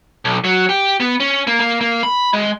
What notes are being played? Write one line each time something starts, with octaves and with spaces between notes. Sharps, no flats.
B1
F#3
G4
B3
C#4
A#3
A#3
A#3
B5
G#3